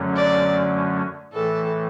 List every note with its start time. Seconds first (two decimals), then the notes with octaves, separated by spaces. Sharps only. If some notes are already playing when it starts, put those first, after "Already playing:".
Already playing: F#2 D3 F#3 A3 C#4
0.16 D5
1.33 A2 E3 A3 A4